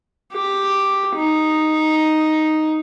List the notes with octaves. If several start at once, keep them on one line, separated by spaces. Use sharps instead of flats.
G4
D#4